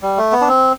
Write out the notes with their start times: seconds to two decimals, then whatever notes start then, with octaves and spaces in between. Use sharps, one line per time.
0.02 G3
0.18 A3
0.32 B3
0.41 D4
0.48 C4